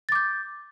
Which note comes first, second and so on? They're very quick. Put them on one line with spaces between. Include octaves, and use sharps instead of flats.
A6 D6 G6